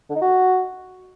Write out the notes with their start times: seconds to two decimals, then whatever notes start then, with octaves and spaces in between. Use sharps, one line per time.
0.09 D3
0.15 D#4
0.21 F#4